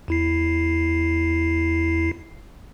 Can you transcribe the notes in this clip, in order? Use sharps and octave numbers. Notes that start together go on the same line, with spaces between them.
E2 E4 C7